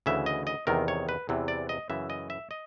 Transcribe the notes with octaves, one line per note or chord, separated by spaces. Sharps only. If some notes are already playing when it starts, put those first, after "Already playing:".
D2 C#3 E3 E5
D#5
D#5
E2 C3 D#3 A#4
C#5
B4
E2 C3 E3
D5
D#5
F#2 C#3 E3 E5
D#5
E5
D#5